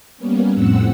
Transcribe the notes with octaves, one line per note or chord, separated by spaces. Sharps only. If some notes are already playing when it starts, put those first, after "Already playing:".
G3 A#3 B3 C#4
F2 A2 C4 F#5 E6